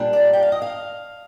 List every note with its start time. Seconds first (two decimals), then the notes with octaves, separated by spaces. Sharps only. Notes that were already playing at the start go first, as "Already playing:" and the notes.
Already playing: A#2 G3 D4
0.13 D5
0.33 G5
0.42 F5
0.52 D#5
0.62 F5